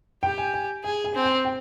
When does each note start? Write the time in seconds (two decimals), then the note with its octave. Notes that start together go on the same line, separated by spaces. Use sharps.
0.23 G4 G5
0.38 G#5
0.54 G#5
0.84 G#4 G#5
1.04 G#5
1.14 C4
1.24 G5
1.45 G5